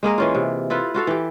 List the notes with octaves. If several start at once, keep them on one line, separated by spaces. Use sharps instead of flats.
G#3 A#3 G#4 A#4
E3 C#4 F4
C3
E4 F4 A4 B4
F4 F#4 A4 F5
E3 G4